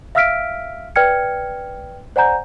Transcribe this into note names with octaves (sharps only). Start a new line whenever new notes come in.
E5 F5 E6 F6 B6 D7
B4 D5 G5 F6 G#6 C#7
C5 D5 F#5 G#5 A#5 G6